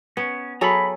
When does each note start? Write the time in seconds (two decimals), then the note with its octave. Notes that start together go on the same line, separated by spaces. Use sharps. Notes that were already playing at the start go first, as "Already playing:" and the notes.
0.17 B3 C#4
0.61 F#3 G#4 A4 A#5 B5